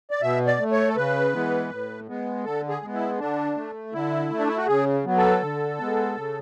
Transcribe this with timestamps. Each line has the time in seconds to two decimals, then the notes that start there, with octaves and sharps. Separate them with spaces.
0.11 D5
0.22 B2 E5
0.46 D5
0.59 A3
0.72 C#5
0.88 A4
0.96 C#3 B4
1.33 E3 G#3 B3
1.70 A2
2.08 G#3 B3
2.44 D3 A4
2.69 G#4
2.82 G#3 B3
2.94 E4
3.19 D3 D4
3.57 A3
3.93 D3 E4
4.30 A3
4.39 D4
4.48 E4
4.57 F#4
4.67 C#3 G#4
5.05 F#3 B3
5.17 A4
5.42 D3
5.79 G#3 B3
6.16 C#3